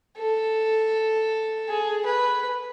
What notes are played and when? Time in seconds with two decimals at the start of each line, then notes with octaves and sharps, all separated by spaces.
0.18 A4
1.69 G#4
2.06 B4